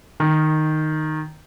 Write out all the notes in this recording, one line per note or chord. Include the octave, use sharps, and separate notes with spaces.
D#3